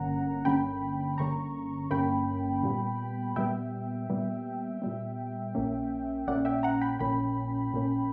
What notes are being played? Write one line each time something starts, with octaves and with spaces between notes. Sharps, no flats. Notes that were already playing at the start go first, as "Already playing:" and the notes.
Already playing: G1 G2 D3 A#3 C#4 F#5 A#5
G1 G2 D3 A#3 C#4 G5 B5
G1 G2 D3 A#3 C#4 A#5 C#6
G1 G2 D3 A#3 C#4 G5 B5
A#2 G3 B3
A#2 G3 B3 E5 G5
A#2 G3 B3
A#2 G3 B3
A#1 A#2 A#3 C#4
A#1 A#2 A#3 C#4 D5 F#5
E5 G5
F#5 A#5
G5 B5
A#1 A#2 A#3 C#4 G5 B5
A#1 A#2 A#3 C#4